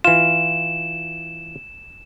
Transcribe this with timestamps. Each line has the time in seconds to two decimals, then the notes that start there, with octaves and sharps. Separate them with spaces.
0.04 E3 F4 E7